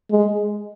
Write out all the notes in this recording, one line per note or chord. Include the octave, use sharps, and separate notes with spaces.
G#3